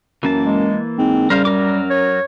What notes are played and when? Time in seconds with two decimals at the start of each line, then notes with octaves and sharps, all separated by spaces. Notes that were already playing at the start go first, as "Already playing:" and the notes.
0.23 F#2 E3 A#3 A5
0.46 G#3
0.98 G#2 C4
1.30 C#3 G3 A#4 C5 F5
1.45 F#2 F#3 A#4 D6
1.90 C#5